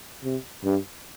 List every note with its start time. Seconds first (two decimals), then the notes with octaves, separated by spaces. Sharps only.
0.24 C3
0.64 G2